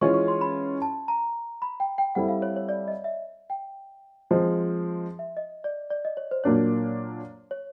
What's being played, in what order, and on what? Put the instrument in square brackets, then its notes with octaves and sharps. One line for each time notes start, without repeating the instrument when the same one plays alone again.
[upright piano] E3 G#3 C#4 F4 [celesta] C#6
[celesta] C#6
C6
B5
A5
A#5
B5
G5
G5
[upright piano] G3 C4 E4 A4 [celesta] F#5
[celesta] F5
C#5
C#5
D5
D#5
E5
G5
[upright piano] F3 G#3 C4
[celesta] E5
D#5
D5
D5
D#5
C#5
C5
[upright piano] A#2 F#3 A#3 D4 [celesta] C#5
[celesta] C#5